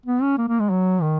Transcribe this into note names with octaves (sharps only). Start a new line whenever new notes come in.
B3
C#4
A#3
A#3
G#3
F#3
D#3